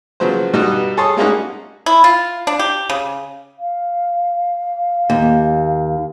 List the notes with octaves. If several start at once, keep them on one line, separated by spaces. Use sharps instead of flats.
C#3 F3 F#3 B3 C5
G2 B2 G3 D#4 F#5
G#4 A4 C#5 A5 C6 D#6
G3 G#3 A#3 C#4 D#4 F#4
E4
F4
D4
G4
C#3
F5
D#2